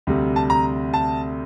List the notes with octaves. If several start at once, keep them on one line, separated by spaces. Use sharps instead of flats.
D2 C3 G3
A5
A#5
A5